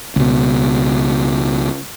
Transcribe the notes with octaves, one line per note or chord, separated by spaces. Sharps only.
C#2 B2